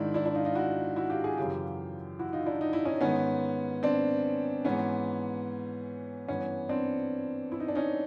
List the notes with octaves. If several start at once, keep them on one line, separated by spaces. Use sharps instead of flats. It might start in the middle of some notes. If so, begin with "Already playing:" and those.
Already playing: G#2 D#3 D4 E4
D4 E4
D4 E4
D#4 F4
D#4 F4
E4 F#4
E4 F#4
F4 G4
F#4 G#4
F#2 C#3 E3 F4 G4
E4 F#4
D#4 F4
D4 E4
D#4
E4
C#4 D#4
G#2 D#3 B3 C#4
C4 D4
G#2 E3 B3 C#4
G2 E3 B3 C#4
C4 D4
E4
D#4
D4
C#4 D#4